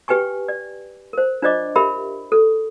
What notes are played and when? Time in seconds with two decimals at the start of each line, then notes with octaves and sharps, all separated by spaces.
0.08 G4 B4 G5 G#5 C#6
0.48 D5
1.13 A#4 C5
1.42 D4 F4 C5 D5 D#5 D6
1.76 G4 A#4 E5 B5
2.32 A4